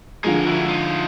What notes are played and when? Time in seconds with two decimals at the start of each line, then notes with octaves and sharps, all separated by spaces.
0.24 D3 F3 G#3 G#4 A#4
0.46 E4 F#4
0.68 D#4 F4